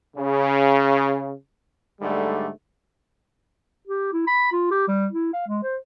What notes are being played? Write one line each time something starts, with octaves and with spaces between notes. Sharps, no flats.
C#3
G#2 D3 G3 A3
G4
E4
B5
F4
G4
G3
E4
F5
G#3
C5